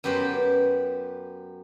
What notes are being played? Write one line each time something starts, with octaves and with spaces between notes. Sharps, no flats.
F#2 B3 G4 B4 C5